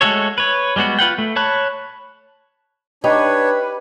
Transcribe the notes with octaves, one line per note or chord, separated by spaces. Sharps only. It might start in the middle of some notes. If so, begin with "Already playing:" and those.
G#3 A3 F#4 A4 C#5
B4 C#5
G3 G#3 B3 F#4
F4 B4 F#5 G5
A3
C#5 A5 B5 C#6 F#6
D4 D#4 G4 B4 C#5 C#6